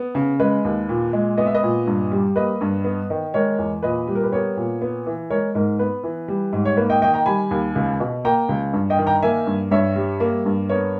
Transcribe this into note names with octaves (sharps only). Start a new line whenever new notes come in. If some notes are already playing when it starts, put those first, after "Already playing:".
Already playing: B3
C#3
G#3 B4
D#2
A#2
G#3
B3 D#5
E5
B4 D#5
A#2
G2
G3
A#3 B4 D#5
G2
B3
D#3
G#3 A#4 C#5
E2
A#2 B4 D#5
G3
A#4
B4
B3 A#4 C#5
A#2
B3
E3
G#3 A#4 C#5
G#2 A#4
B3 B4
E3
G3
G#2
C#5
A#3 B4
D#5 G5
D#3 D#5 G5
G5 A#5
G3 G#5 B5
D#2
C#2
B2
A#3 G5 A#5
C#2
G2
D#5 G5
D#3
G5 A#5
A#3 E5 G#5
G2
G2 C#5 E5
G3
A#3
G2
B3 A#4 C#5